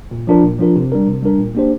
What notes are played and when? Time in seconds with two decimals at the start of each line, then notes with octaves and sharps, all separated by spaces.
0.11 A#2
0.27 F3 D4 F4 A#4
0.43 A#2
0.59 F3 D4 F4 A#4
0.76 C3
0.92 G3 D4 A#4
1.07 C3
1.23 G3 D4 A#4
1.39 A#2
1.55 A#3 D4 G4 C5